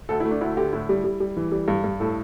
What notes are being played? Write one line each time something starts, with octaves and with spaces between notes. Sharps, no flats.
D2 A4
E4
A3
D4
D2 E4
D3 G4
A2 E4
G3
G3
G3
E3
G3
G2
G2
A2 A4